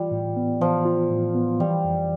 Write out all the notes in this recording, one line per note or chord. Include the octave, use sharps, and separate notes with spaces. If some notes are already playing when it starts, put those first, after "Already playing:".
Already playing: E3 G3 F4
A2
B3
E3 F3
F4
A2
B3
E3 G3
F2